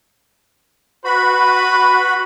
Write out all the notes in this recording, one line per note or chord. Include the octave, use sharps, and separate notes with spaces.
F#4 B4 B5